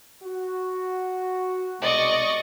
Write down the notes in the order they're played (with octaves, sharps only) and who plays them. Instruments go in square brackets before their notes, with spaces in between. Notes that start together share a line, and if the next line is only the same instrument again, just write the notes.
[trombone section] F#4
[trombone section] C2 B2 G#3 [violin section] D5 D#5 C#6